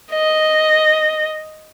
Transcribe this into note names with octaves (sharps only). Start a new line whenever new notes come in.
D#5